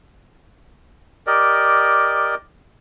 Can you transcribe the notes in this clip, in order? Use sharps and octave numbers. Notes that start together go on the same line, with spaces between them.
G4 A#4 D5 D#5